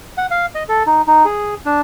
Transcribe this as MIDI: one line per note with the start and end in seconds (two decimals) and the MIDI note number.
0.18 0.26 78
0.31 0.46 77
0.55 0.63 75
0.69 0.83 69
0.87 1.02 63
1.07 1.25 63
1.25 1.54 68
1.66 1.81 62